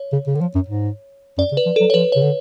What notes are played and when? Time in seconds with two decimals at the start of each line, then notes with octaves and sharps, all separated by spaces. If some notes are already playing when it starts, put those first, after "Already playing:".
Already playing: C#5
0.13 C#3
0.27 C#3
0.35 D3
0.41 F3
0.55 F#2
0.68 G#2
1.38 F#2 D5
1.52 C#3
1.57 B4
1.66 F3
1.76 F#3 A4
1.90 C#5
1.94 F3 B4
2.12 C#3 C#5
2.22 D3